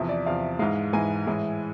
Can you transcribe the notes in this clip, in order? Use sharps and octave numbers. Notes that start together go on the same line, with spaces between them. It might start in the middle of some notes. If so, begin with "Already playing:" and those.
Already playing: E2 C3 F3 E5
D5
E2 C3 F3 F5
G#2 E3 G#3 F5
G#2 E3 G#3 G#5
A2 E3 G#3